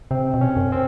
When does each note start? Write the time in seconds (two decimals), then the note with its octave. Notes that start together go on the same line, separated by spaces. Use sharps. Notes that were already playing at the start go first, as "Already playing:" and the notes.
0.11 C3 C4
0.34 B2
0.41 C#4
0.57 F#2
0.72 C4